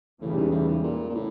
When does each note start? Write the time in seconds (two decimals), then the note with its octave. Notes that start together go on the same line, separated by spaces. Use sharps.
0.21 E2 A2 C#3 E3 G3
0.36 G#2
0.51 A2
0.68 G#2
0.84 A#2
1.09 A#2
1.15 A2